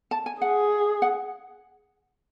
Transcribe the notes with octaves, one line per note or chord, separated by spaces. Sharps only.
A5
G#5
G#4 F#5
F#5